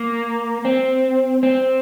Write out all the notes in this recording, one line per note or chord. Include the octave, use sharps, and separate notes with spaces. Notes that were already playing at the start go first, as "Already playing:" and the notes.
Already playing: A#3
C4
C4